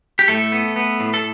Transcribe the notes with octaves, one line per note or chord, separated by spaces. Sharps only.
G4
A2 A3 A4
B3
B3
A2
A4